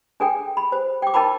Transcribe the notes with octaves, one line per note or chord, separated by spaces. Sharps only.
D4 G#4 A4 G5
B5
C5
G5 D6
D#4 A#4 G5 A5 B5 D6